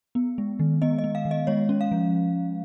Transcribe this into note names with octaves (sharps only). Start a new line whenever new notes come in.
B3
G#3
D#3
B3 D#5
D#5
B3
F5
D#3
D#5
G#3 C#5
C#4
F5
F3